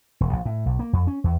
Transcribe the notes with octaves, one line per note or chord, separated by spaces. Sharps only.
E1
A#1
A2
B1
A#3
F2
C#4
E2